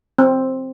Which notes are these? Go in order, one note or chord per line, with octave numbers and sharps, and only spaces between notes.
C4